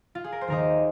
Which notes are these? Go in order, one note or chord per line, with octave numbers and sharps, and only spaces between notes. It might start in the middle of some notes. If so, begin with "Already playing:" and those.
F4
G#4
A#4
C5
D#2 D#3 A#3 A#4 D#5